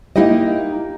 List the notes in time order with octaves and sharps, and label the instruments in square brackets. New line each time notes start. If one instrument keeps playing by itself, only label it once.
[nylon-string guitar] A#3 D#4 E4 G4 D#5